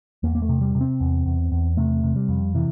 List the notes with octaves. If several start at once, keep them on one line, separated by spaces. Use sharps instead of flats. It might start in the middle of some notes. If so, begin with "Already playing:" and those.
E2 A#3
A#3
A3
C3
G3
C3
C4
E2
E2
E2
C3 A3
C3
G3
F2
C3 E3